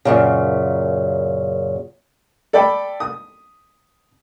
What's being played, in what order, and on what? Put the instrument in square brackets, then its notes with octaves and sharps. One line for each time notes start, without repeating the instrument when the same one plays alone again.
[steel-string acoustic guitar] F#2 A#2 C#3
[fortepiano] A4 D5 G5 B5
D#6